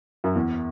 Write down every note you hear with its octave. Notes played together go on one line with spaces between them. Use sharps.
F#2
E2